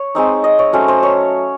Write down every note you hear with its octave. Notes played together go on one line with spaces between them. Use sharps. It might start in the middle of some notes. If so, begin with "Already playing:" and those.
Already playing: C#5
G#3 C4 D#4
D#5
C#5
F#3 A3 C#4 C5
C5
C#5